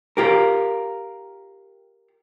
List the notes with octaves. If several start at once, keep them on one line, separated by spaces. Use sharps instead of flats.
F4 G4 A#4